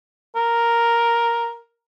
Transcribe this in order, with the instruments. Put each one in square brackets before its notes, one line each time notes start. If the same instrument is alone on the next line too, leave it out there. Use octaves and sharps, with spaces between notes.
[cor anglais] A#4